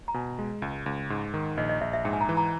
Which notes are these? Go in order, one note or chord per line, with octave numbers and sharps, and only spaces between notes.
A#5
B2 G#5
G#3
C#2
C#2
G#2
D#3
A#1 D#5
D#5
A#1 E5
E5
G#2 G5
G#5
A#5
E3
A#5